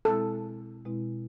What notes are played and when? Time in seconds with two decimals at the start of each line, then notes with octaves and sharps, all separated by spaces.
0.05 B2 G#3 C4 E4 A4
0.85 B2 G#3 C4 E4